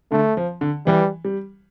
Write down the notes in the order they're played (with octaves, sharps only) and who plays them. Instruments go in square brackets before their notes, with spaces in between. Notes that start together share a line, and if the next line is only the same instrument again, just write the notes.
[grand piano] D3 [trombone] A3
[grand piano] F3
D3
[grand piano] E3 [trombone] G3
[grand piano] G3